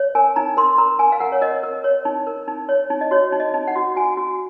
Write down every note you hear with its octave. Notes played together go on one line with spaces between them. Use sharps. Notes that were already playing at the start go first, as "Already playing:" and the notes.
Already playing: C#5
A#4 G#5
D#4 A#5
A#4 C6
A#4 A#5
A#4 G#5
F5
A#4 F#5
C#5
A#4 D#5
A#4
C#5
D#4
A#4
D#4
C#5
D#4
D#5
F#4 C#5
D#4
D#5
D#4
F#5
F#4
F#4 G#5
F#4